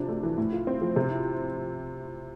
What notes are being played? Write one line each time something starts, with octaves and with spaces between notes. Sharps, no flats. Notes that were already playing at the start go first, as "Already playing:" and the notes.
Already playing: C3 F3 D4
A3
E3
A2
F4
C4
F3
C3
E4